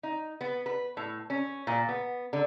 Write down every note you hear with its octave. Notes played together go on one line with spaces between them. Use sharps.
D#4
B3
B4
A2
C#4
A#2
B3
D3